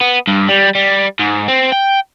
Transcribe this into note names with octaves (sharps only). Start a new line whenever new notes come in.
B3
G2
G3
G3
G#2
C4
G5